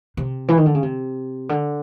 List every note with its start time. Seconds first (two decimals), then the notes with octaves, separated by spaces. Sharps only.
0.17 C3
0.48 E3
0.57 D#3
0.66 D3
0.75 C#3
0.83 C3
1.49 D3